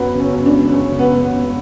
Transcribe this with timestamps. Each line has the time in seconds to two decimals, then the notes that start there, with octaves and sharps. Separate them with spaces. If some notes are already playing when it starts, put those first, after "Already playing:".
Already playing: F#2 B3
0.14 C#3
0.20 C#4
0.33 F#2
0.46 D4
0.53 C#3
0.72 F#2 C#4
0.92 C#3
0.99 B3
1.12 F#2
1.25 B3
1.31 C#3